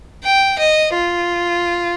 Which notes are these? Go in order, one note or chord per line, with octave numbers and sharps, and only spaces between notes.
G5
D#5
F4